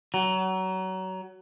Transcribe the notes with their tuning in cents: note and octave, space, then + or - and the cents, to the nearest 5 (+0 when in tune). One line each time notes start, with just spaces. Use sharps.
F#3 +25